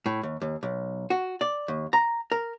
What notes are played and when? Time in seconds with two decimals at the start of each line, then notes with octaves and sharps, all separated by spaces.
0.06 A2
0.23 D#2
0.41 D#2
0.63 B1
1.10 F#4
1.41 D5
1.68 D#2
1.93 A#5
2.32 A#4